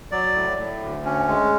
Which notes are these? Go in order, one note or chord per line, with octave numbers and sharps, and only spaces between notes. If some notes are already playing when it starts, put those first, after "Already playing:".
F#3 D5
A2
A2
D2
C#4
G#3